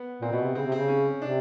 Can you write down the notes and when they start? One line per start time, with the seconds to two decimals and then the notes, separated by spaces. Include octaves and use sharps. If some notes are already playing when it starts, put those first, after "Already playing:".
Already playing: B3
0.21 A#2 C4
0.32 B2 B3
0.44 C3
0.55 C#3 C4
0.66 C3
0.72 C#3 C4
0.88 C#4
1.21 C3 D4